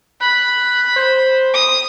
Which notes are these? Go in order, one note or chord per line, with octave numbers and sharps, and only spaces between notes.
B5 F#6
C5
D#6